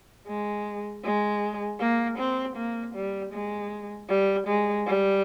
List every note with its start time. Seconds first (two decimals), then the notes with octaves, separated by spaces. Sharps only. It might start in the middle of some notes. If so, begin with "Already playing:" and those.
0.28 G#3
1.04 G#3
1.80 A#3
2.18 C4
2.56 A#3
2.95 G3
3.33 G#3
4.09 G3
4.47 G#3
4.87 G3